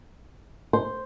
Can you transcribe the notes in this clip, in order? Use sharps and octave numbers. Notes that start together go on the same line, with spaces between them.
C5